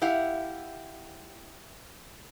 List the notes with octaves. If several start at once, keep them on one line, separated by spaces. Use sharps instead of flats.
E4 G4 F5 F#5